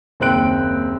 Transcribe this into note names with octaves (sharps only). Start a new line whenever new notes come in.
F#1 D#2 C4 G5 F#6 D7